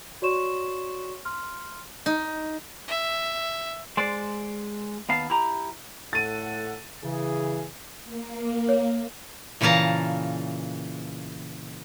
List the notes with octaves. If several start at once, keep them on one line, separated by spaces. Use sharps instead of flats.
F#4 C#5 D5 C6 C#6 E7
C6 F6
D#4
E5
G#3 C5 D5
D#2 B3 F5 A5
E4 G4 A#5
A2 A4 F#5 A6 D#7
C#3 E3 G#4
A#3
C#5
A#2 C#3 E3 F5 A5 A#5